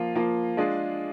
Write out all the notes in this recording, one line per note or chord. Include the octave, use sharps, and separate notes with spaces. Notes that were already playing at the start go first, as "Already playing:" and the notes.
Already playing: F3 A#3 F4
F3 A#3 F4
G#3 D4 F4 G#4